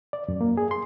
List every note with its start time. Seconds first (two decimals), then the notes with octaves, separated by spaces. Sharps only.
0.13 D5
0.28 F#2
0.41 A#3
0.57 G#4
0.71 C6